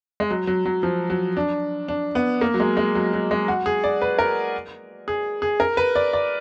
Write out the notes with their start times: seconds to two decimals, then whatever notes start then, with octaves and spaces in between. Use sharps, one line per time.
0.20 G#3
0.31 F#3
0.47 F#3
0.65 F#3
0.83 F3
1.10 F#3
1.37 D4
1.88 D4
2.15 B3
2.41 A#3
2.54 F#3
2.60 G#3
2.77 G#3
2.95 F#3
3.13 F#3
3.31 G#3
3.48 F#4
3.66 G#4
3.84 D5
4.02 B4
4.19 A#4
5.08 G#4
5.42 G#4
5.60 A#4
5.77 B4
5.95 D5
6.13 D5